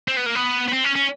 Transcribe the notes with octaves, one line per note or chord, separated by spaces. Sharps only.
C4
B3
A#3
B3
B3
C4
C#4
C#4